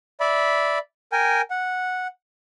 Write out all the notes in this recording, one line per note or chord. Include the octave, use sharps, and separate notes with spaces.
D5 E5 B5
A#4 G5 G#5
F#5